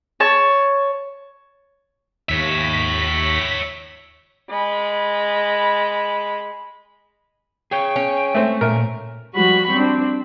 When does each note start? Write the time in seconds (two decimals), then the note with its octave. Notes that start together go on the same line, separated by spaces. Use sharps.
0.20 C#5 A5
2.29 D#2 C#5 E5 A#6 B6
4.50 G#3 B5
7.71 G#4 C#5 G5
7.96 C#4
8.34 A3 C4
8.61 A#2 A3 A#4
9.35 F3 G3 F#4 B5 C#6
9.71 G3 C4 D4